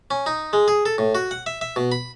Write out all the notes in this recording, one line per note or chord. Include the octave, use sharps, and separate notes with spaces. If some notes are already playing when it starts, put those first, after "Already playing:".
C#4
D#4
G#3
G#4
A4
A2
F#4
F#5
E5
E5
B2
B5